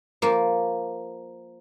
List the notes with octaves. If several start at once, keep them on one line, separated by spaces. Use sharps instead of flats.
F3 A#3